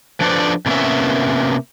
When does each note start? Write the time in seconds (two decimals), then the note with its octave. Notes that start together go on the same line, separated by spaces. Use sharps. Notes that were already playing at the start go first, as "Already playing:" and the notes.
0.20 F3 D4 A4 B4 C5 D5
0.66 C3 G3 A#3 B3 C#4 E5